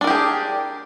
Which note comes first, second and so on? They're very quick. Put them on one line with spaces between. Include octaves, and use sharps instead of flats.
D4 A#4 G4 G#4